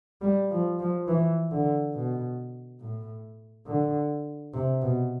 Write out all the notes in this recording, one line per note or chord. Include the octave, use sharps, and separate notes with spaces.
G3
F3
F3
E3
D3
B2
A2
D3
C3
B2